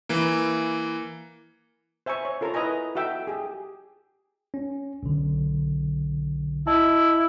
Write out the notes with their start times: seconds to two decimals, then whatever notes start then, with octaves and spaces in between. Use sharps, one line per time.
0.09 E3 A#3
2.06 C5 E5 G#5 A#5 C#6
2.25 C#5
2.41 F4 A4 A#4 C#5 A#5 C6
2.54 E4 B4 D#5 E5 G#5 A#5
2.95 F#4 A4 E5 G5
3.27 G4 G#4
4.54 C#4
5.03 B1 D3
6.67 E4 D#5 A5